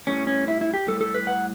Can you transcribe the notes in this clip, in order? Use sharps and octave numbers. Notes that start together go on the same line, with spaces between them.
A2 G3 C#4
C#4
E4
E4
G4
A2 G3 A4
A4
B4
F#5